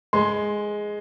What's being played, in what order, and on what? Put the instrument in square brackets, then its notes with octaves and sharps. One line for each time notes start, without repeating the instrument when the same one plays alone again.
[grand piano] G#3 C6